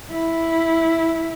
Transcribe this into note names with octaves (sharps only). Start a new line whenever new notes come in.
E4